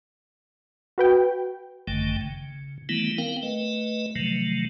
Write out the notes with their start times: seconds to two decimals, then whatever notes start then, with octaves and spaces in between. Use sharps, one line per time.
0.98 F#4 B4 G5
1.87 G#1 F#2 D3 D#3 A3 G5
2.21 C#3
2.89 D#3 E3 G3 A3 B3 E4
3.18 B3 C4 A#4 F5 G5
3.43 A3 B4 D#5
4.16 C3 D#3 F3 F#3 A3